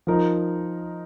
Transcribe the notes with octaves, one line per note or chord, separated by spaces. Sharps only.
F3 D#4 A#4